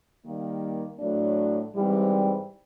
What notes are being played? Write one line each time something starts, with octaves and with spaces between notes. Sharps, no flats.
D#3 G3 A#3
A2 F#3 A3 D4
G#2 E3 G3 C4